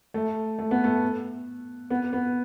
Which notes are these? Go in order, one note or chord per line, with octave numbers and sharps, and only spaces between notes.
A3
A3
B3
A3
B3
B3